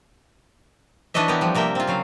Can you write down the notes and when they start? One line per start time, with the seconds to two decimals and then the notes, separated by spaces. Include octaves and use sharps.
1.14 E3 D4 B4 C#5 D#5 E5
1.28 B3 G4 A#4
1.41 F3 G3
1.55 C3 A#3 A#4 E5 G5
1.75 C4 F4
1.87 C#3 F#3 F5